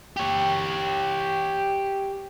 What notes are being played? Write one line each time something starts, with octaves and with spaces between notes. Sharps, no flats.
G4 C#5